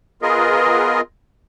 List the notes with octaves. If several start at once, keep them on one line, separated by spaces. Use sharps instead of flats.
B3 F4 G#4 A#4 D#5